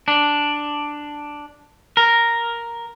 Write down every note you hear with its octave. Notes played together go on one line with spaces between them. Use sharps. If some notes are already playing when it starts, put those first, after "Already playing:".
D4
A#4